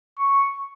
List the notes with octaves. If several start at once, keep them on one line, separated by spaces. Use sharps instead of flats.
C#6